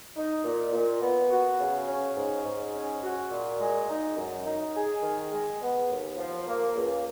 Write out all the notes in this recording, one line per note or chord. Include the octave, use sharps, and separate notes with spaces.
D#4
A#2
A#2
B3
F#4
C#3
C#4
G#2
G#2
C#4
F#4
A#2
G#3
D#4
F#2
D#4
G#4
D#3
G#3
B3
D#2
F3
A#3
C#2